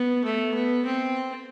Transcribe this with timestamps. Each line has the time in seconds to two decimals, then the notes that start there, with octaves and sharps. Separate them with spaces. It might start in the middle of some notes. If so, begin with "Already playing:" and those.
Already playing: B3
0.25 A3
0.55 B3
0.86 C4